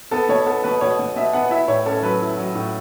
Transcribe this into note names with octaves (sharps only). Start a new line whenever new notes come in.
B3 A4
B2 C#5
B3 A4
B2 B4
B2 C#5
B2
B2 E5
B3 F#5
E4 E5
A2 C#5
C#4 A4
F#3 B4
E4
F#3
A2